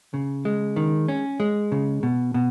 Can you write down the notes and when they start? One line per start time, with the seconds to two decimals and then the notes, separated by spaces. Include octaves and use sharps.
0.14 C#3
0.45 G#3
0.76 D#3
1.08 C#4
1.40 G#3
1.72 C#3
2.03 B2
2.34 B2